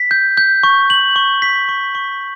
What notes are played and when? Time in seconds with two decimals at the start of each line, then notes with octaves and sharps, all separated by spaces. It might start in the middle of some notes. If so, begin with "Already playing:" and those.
Already playing: B6
0.11 G6
0.37 G6
0.63 C#6
0.90 F#7
1.16 C#6
1.42 B6
1.69 C#6
1.95 C#6